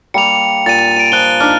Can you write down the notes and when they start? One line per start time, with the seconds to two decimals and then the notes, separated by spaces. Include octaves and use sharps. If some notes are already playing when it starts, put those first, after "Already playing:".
0.14 G3 A#3 C#7 F7
0.66 A#2 A6 D#7
0.96 A#5 D7 D#7
1.12 F3 F#6 G7
1.40 D4 D#4 F6